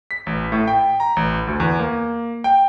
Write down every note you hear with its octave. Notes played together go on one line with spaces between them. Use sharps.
B6
A1
A2
G5
A#5
A1
D2
E2
A#3
G5